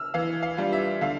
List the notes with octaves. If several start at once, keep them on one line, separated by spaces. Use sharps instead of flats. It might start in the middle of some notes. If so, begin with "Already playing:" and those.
Already playing: E6 F6
E3 F5
F5
G3 D4 F4
E5
D3 F5